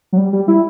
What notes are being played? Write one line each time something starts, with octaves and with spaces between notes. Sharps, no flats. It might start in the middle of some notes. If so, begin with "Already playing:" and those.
F#3
G3
G3
E4